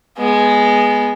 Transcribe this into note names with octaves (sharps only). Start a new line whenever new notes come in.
G#3 B3